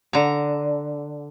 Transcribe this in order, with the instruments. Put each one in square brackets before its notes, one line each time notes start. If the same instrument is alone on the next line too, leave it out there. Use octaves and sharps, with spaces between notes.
[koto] D3 A#5